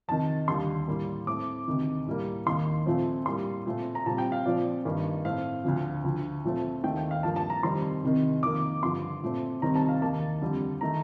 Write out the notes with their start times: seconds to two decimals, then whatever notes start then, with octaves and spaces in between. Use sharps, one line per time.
0.08 F2 C3 D#3 A5
0.48 D#2 D3 G3 C6
0.88 A2 G3 A#3
1.27 A2 A3 C4 D6
1.68 D2 C3 D#3
2.07 A2 G3 A#3
2.46 D#2 D#3 A#3 C6
2.86 A#2 F3 A3 C4
3.26 A2 G3 A#3 C6
3.66 A#2 A3 C4
3.95 A#5
4.05 A#2 G3 C4 A5
4.18 G5
4.32 F5
4.45 A#2 F3 C4 D5
4.85 G2 D#3 A#3
5.25 A2 A3 C4 F5
5.64 D2 D3 F3
6.04 D2 D3 F3
6.44 A#2 F3 A3 C4
6.84 D#2 D#3 A3 C4 G5
6.97 G5
7.11 F5
7.23 G2 F3 A#3 A5
7.36 A5
7.50 A#5
7.63 F2 C3 D#3 G3 C4 C6
8.03 C2 C3 D#3
8.42 F2 D#3 A#3 D6
8.82 G2 D3 F3 C6
9.23 A#2 A3 C4
9.62 C2 C3 D#3 G3 C4 A#5
9.76 A5
9.89 F5
10.02 D#2 D#3 A#3 A5
10.42 F2 D3 G3
10.81 D#3 A3 A#5